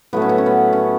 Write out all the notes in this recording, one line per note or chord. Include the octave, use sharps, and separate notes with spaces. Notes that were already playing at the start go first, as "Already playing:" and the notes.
A2 F#3 A3 B3
C#4
B3
C#4
B3
C#4